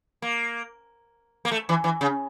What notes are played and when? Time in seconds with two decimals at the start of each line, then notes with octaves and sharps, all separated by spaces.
0.22 A#3
1.45 A#3
1.52 A3
1.69 E3
1.84 E3
2.01 C#3